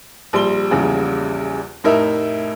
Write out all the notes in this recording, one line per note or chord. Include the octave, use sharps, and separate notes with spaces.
A#1 G3 C6 G7
A#1 E2 C#3 G3
F1 A2 D#4 A#4 E5